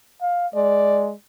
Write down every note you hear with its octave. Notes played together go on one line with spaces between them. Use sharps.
F5
G#3 D5